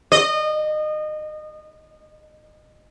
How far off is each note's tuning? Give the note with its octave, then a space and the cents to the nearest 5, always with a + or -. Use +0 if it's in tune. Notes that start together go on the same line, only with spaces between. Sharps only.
D#5 -25